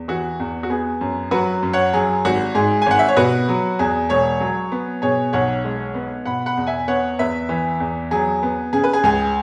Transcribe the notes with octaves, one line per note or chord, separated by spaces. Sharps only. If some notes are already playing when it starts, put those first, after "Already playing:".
Already playing: E2
E3 F#4
E2
F#4
B3 G#4
F#2
F#3 F#4 B4
F#2
C#5 F#5
F#3 G#4
G#1 F#4
G#2 G#4
G#5
G#1 F#5
E5
C#5
B2 F#4 B4
F#3
E2 G#4
E1 G#4 C#5
F#3
B3
B2 G#4 C#5
B1 C#5 F#5
G#3
B3
B2 F#5 B5
F#5 B5
E2
E5 G#5
B3 C#5 F#5
E2 B4 E5
E3
E2
F#3 G#4
B3
C#3 G#4
B4
G#4
C#2 G#4